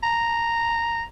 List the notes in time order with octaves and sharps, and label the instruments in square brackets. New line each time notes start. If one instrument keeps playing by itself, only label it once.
[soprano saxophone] A#5